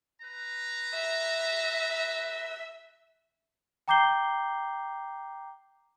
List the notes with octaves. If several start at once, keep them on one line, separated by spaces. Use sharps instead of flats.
B4 A#5
E5
G5 A#5 D6 G6 C7 G7